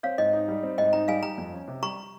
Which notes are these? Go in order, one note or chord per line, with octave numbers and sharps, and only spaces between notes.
C4 C#5 F5
G#2 D#5 G5
D#4
G3
C4
G#2 D#5 G5
D#4 G5 A#5
G3 F5 G#5
G3 G5 A#5
F2
C#4
C3
G3 A#5 C#6